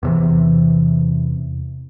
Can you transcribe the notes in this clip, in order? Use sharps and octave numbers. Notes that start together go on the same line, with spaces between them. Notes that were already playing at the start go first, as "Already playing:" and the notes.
E2 C3 E3